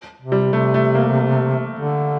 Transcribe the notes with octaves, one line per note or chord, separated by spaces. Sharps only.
C3
G3
C3 A3
A3
A#3
D3